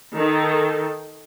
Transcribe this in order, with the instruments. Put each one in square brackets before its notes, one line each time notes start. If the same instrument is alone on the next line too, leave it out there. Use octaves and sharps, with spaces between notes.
[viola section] D#3 A4